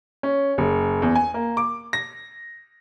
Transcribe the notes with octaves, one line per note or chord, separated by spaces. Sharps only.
C#4
F#1
E2
G#5
A#3
D6
A#6